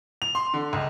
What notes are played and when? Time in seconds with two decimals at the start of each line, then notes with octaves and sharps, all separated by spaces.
0.22 F7
0.35 C6
0.54 D3
0.73 C#2